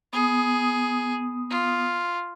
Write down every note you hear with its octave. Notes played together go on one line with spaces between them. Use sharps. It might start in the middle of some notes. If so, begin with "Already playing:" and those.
B3 G#4 D#6
F4